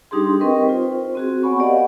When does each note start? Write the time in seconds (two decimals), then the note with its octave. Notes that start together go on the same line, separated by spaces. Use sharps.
0.11 G3 D4 D#4 G4 G#4 C6
0.40 C4 A#4 B4 D#5 G5 C#6
0.65 F4 C5
1.15 C4 F#4 G#4
1.43 B3 C#5 F#5 G#5 B5 C#6
1.58 G4 A#4 D5 D#5 F5 F#5